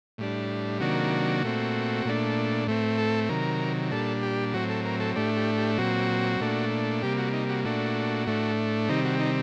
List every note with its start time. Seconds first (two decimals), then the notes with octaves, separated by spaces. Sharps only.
0.18 A2 G3 D4
0.80 C3 D#3 F#3 A#3 D4 F#4
1.43 A#2 A3 C4
2.05 A#2 A3 D4
2.67 A2 A3 C4
2.98 A4
3.29 C3 D#3 F#3 A#4
3.91 A#2 G3 D4 A4
4.23 G4
4.54 A2 F#3 C4 F#4
4.70 A4
4.85 A#4
5.00 A4
5.16 A2 A3 D4 G4
5.37 G4
5.57 G4
5.78 A#2 F#3 C4 F#4
6.41 A#2 A3 D4
7.02 C3 G3 A#3 G4
7.18 F#4
7.33 D#4
7.49 F#4
7.65 A#2 A3 D4 F#4
8.27 A2 A3 D4
8.89 C3 D#3 G3 C4 D#4
9.05 F#4
9.20 D#4